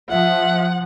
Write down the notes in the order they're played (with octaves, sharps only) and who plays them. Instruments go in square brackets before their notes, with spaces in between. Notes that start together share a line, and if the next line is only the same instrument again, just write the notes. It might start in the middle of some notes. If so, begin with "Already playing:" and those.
[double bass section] F3 [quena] E5 [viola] F#5